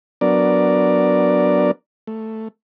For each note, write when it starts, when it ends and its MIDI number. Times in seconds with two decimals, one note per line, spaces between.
0.21 1.71 54
0.21 1.71 59
0.21 1.71 62
0.21 1.71 70
0.21 1.71 74
2.07 2.48 57